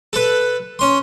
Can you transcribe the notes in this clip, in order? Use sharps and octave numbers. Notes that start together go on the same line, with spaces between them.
A4 B4
C#4 C6